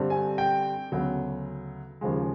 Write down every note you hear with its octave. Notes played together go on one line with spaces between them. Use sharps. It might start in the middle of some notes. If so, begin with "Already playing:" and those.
Already playing: G2 D3 G3 C4
G#5
G5
D2 C#3 F#3 B3
D#2 C#3 F3 G#3